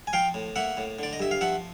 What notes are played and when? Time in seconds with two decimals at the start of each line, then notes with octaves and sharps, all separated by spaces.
0.07 G#5
0.13 F3 F5 G5
0.34 A2
0.56 A#3 E5 F#5
0.77 A2
0.99 D3 D5
1.13 D#5
1.20 G2 E5
1.31 F5
1.41 F3 E5 F#5